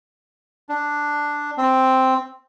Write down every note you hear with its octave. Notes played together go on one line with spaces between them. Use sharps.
D4
C4